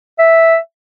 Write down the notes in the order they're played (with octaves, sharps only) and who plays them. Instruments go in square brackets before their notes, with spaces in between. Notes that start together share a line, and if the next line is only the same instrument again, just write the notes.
[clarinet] E5